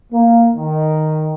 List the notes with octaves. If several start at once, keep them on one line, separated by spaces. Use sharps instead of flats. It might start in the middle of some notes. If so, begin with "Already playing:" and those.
A#3
D#3